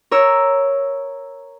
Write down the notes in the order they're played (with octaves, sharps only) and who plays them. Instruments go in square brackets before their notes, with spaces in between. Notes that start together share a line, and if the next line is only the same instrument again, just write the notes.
[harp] A#4 C#5 E6